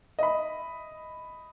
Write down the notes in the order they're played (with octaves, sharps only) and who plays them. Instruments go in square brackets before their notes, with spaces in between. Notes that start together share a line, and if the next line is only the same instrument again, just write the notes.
[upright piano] D#5 E5 B5